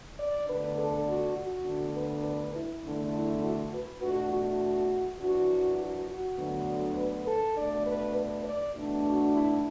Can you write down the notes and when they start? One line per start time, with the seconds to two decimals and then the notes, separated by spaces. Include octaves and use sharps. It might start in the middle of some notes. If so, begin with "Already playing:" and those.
0.18 D5
0.48 D2 D3 B3 D4 B4
0.77 A4
1.07 F#4
1.37 F#4
1.66 D2 D3 B3 D4
1.95 B4
2.24 B4
2.55 E4
2.84 E2 D3 A3 D4
3.13 E4
3.43 F#4
3.73 B4
4.02 E2 B2 A3 D4 F#4
4.31 F#4
5.20 F#2 E3 D4 F#4
5.79 F#4
6.08 F#4
6.38 D2 D3 F#3 B3 D4
6.96 B4
7.26 A4
7.56 B2 A3 D4 D5
7.85 B4
8.16 B4
8.44 D5
8.74 E2 B2 A3 D4
9.04 F#4
9.33 E4